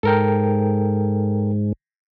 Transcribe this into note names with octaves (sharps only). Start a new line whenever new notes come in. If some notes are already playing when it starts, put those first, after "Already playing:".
G#2 A4 A#4 G5